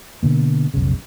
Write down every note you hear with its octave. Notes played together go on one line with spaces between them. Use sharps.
B2 D3 A#3
F1 B1 C#3